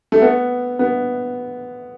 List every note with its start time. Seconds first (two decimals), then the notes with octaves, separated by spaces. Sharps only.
0.12 A3
0.22 B3
0.79 B3